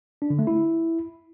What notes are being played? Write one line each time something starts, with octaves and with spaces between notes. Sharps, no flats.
D4
D3
A3
E4